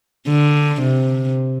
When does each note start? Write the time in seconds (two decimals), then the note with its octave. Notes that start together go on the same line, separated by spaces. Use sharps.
0.28 D3
0.82 C3